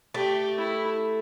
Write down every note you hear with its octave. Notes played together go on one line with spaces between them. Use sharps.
A3 G4
E4